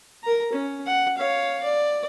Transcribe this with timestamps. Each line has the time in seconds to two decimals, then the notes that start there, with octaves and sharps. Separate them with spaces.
0.24 A#4 A#5
0.53 C#4
0.86 F#5
1.18 C#5 F5
1.63 D5